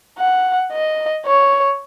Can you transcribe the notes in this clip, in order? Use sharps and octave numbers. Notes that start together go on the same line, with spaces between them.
F#5
D#5
C#5